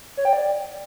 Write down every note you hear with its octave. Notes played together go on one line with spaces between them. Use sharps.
C#5
G5
D5